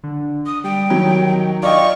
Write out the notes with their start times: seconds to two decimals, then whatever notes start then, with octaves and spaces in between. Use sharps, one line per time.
0.03 D3
0.46 D#6
0.64 G3 G5
0.90 D#3 F#3
1.63 F4 D5 D#5 G5 C#6